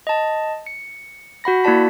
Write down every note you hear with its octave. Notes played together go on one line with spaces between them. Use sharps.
D#5 A5
C#7
F#4 F#5 B5 A#6
A#3 E4 F#4 D5 A5 B6